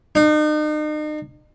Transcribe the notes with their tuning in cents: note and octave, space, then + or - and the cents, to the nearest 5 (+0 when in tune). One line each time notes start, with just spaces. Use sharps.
D#4 -40